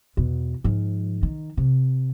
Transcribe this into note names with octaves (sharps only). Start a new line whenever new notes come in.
E2 B2
G#2 F3
D#3
C3